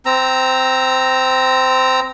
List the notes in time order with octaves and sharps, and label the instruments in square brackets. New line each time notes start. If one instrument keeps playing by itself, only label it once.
[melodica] C4 A#5 E6